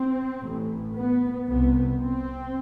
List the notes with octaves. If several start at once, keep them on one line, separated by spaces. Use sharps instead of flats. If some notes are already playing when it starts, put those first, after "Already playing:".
Already playing: C4
A1 A2
B3
C2 C3 B3
C4